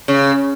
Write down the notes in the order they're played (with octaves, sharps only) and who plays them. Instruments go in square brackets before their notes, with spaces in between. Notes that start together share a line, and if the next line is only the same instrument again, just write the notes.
[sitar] C#3